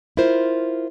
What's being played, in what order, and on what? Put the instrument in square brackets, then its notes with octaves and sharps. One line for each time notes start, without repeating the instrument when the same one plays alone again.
[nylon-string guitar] E4 F4 A#4 C5